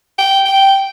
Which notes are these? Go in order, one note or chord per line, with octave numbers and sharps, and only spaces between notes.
G5
G5